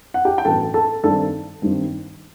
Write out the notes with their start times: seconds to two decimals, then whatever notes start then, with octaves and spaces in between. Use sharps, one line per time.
0.14 F#5
0.25 G4 G5
0.38 G5
0.45 A1 G2 F#3 B3 A4 A5
0.74 A4 A5
1.04 G2 D#3 G3 C4 A4 A5
1.62 G2 D#3 G3 C4